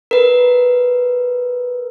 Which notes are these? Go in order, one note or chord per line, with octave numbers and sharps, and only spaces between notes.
A#4 B4